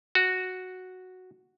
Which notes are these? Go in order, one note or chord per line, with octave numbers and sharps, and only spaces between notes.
F#4